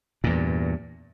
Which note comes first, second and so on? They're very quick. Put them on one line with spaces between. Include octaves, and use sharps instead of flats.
A#2 E2 G2